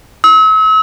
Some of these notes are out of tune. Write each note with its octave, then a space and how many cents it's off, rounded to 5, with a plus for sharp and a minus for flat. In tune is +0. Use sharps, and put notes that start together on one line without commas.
E6 -40